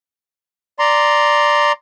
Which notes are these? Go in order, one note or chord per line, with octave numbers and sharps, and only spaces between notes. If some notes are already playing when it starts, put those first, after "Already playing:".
D5 A#5 C6